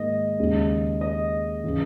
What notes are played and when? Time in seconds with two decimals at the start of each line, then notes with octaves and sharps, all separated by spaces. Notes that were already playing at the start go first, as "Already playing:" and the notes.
Already playing: G#2 D#3 A#3 D#5
0.39 D#2 C#3 G#3
1.01 D#5
1.64 C#3 E3